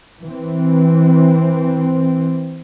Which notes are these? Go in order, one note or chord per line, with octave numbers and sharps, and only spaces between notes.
E3 C4